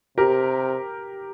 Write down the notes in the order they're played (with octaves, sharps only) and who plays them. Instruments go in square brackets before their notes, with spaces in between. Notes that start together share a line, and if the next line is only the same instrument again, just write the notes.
[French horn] C3 [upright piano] G4 A#4